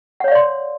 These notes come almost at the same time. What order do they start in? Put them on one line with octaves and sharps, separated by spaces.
F#5 C#5 F5 D5 C6